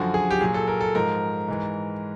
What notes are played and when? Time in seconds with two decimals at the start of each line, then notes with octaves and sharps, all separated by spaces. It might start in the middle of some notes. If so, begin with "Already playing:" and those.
Already playing: F#2 D3 F3 F#4
0.14 G#4
0.31 G4
0.41 A#2 F#3 G#4
0.54 A4
0.67 A#4
0.81 A4
0.95 G#2 F3 A#4
1.48 G#2 E3